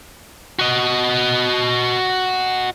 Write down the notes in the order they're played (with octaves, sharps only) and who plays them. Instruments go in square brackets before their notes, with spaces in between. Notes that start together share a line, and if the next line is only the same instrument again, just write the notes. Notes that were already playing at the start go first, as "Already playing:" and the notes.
[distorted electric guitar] F#4 D#5